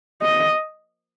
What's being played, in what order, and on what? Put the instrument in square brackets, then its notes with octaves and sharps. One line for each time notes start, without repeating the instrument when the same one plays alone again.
[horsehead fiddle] D#5